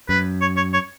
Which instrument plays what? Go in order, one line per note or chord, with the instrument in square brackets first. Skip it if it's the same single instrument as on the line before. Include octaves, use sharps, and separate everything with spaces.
[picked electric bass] F#2 [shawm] B4
[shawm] C#5
C#5
C#5